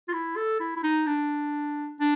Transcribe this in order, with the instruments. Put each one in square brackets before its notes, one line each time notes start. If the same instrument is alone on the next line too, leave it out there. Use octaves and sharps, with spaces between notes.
[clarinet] F4
E4
A4
E4
E4
D#4
D4
D4